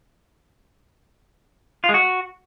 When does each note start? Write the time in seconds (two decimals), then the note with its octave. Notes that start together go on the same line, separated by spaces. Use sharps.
1.84 F4
1.89 G#3
1.94 F#4